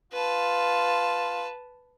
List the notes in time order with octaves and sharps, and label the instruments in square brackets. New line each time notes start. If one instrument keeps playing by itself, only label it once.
[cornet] F4 [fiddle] B4 A5